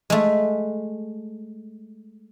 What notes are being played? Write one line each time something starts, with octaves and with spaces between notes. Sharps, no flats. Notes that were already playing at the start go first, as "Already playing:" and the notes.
G#3 A3